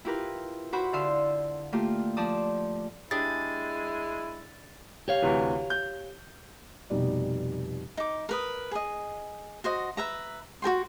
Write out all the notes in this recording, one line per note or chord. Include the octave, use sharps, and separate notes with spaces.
E4 F4 G4 A#4 B4
E4 F#4 C5 B5
D3 E5 F5 C6 E6
A3 A#3 F4 G4
F3 D5 A5 D#6
G#3 D4 E4 G4 G#4 A6
G4 C#5 F5
D2 C3 E3
G6
F1 B2 G3 D#4 D5
D#4 D6
A#4 B4 D#6
G#4 D#5
F#4 C5 D#5
B4 E5 A#5
F#4 A#4 G5 C6